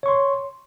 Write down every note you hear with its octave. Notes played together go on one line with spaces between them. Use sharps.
C#5 C6 C#6